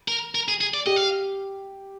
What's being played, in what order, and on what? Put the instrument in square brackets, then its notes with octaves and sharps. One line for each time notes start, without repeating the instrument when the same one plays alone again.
[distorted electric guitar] A#4
A#4
G#4
G#4
D5
[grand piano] G4 [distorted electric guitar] D#5
[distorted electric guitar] F5